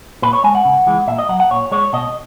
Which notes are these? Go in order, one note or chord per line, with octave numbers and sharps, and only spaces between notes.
A#2 B4
C#5
G#3 G#5
F#5
C#3
E3 G#3
A#2 E5
D#5
F#3 F#5
F#5
A#2 C#5
G#3 C#5
B2 D#5